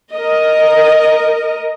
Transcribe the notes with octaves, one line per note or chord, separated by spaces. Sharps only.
A#4 D#5